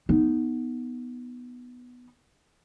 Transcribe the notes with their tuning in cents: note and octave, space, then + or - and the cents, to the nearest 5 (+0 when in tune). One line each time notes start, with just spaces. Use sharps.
B3 +0 D#4 +0